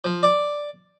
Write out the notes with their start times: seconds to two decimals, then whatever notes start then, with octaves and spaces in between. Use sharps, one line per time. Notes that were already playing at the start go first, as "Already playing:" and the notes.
0.04 F3
0.23 D5